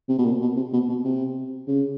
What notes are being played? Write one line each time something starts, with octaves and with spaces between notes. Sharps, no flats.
C3
B2
A#2
B2
C3
B2
B2
C3
C#3